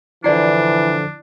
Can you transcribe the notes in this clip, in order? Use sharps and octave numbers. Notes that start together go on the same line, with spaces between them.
D3 E3 F3 D4 E4 D5 C7